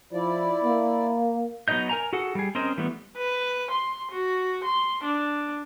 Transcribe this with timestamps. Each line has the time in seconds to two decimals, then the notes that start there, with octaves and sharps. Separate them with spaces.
0.13 F3 E4 D5
0.64 A#3
1.68 F#3 B3 D#4 D#5 G6
1.89 A#4 G#5 A#5
2.13 F#4 G#4 A4 F#5
2.35 G3 G#4
2.55 C4 C#4 A#4 C5 D#5
2.78 E3 G3 A3 B3
3.17 B4
3.71 C6
4.12 F#4
4.64 C6
5.03 D4